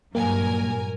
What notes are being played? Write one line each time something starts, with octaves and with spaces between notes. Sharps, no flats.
G2 A#2 F#3 A#3 A#4 G#5